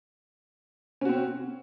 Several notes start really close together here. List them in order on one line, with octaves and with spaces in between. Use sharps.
C#4 F#4 C4